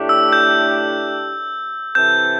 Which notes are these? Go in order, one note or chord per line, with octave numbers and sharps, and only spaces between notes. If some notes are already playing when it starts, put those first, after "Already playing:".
Already playing: A2 A3 D4 G4
E6
G6
C3 E3 C4 A4 G6